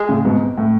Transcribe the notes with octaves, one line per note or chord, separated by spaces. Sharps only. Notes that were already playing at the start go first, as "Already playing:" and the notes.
Already playing: G#3
A2 C#3
G#2 B2
A2